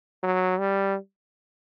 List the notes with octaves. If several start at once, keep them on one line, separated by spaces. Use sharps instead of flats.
F#3
G3